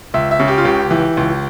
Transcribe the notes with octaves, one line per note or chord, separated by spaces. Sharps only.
C#2 E5
E5
C#3
G4
F4
C#2 G4
E3
C#2